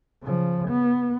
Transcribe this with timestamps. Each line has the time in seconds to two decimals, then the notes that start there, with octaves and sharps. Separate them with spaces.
0.22 C#3 F3
0.68 B3